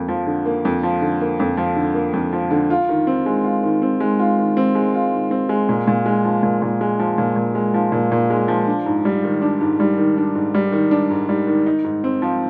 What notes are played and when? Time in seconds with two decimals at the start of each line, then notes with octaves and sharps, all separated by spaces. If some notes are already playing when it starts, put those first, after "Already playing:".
Already playing: F2 A#3
0.08 F3
0.26 D3
0.46 A#3
0.65 F2
0.83 F3
1.01 D3
1.21 A#3
1.40 F2
1.57 F3
1.76 D3
1.95 A#3
2.13 F2
2.33 F3
2.51 D3
2.70 F4
2.89 D#3
3.07 C4
3.26 G#3
3.44 F4
3.63 D#3
3.82 C4
4.00 G#3
4.19 F4
4.38 D#3
4.57 C4
4.75 G#3
4.94 F4
5.12 D#3
5.31 C4
5.49 G#3
5.69 A#2
5.87 A#2
6.06 G#3
6.24 F3
6.43 A#2
6.62 A#2
6.81 G#3
6.99 F3
7.18 A#2
7.36 A#2
7.55 G#3
7.74 F3
7.92 A#2
8.12 A#2
8.30 G#3
8.48 F3
8.67 D4
8.86 G#2
9.05 G3
9.24 D#3
9.42 D4
9.61 G#2
9.80 G3
9.98 D#3
10.17 D4
10.35 G#2
10.55 G3
10.72 D#3
10.91 D4
11.10 G#2
11.29 G3
11.47 D#3
11.66 D#4
11.84 G#2
12.04 C4
12.22 F3